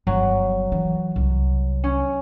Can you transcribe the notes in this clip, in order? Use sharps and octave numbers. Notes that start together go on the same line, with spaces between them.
G1 F#3
E3
C2
C#4